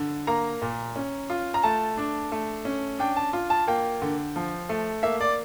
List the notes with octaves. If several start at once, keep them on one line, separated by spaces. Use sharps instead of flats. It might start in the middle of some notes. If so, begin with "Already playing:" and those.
Already playing: D3
A#3 A#5
A#2
C#4
F4
A#5
A3 A5
D4
A3
C#4
D4 G5
A5
F4
A5
A#3 G5
D3
F3
A3
A#3 E5
D5